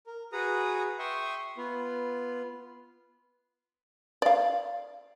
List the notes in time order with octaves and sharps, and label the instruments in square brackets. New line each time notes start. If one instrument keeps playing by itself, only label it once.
[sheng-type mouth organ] A#4
F#4 G#4 B4 A#5 D#6
E5 G5 C6 C#6 D#6
B3 F4
[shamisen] D5 F5